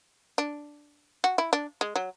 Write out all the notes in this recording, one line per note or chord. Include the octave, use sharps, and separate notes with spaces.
D4
F#4
E4
D4
G#3
F#3